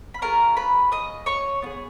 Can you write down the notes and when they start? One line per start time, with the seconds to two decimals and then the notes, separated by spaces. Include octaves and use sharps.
0.14 B5
0.22 C#4 F4 G#4 A#4 A#5
0.57 B4 B5
0.92 D#5 D#6
1.26 C#5 C#6
1.62 B3 F4 G#4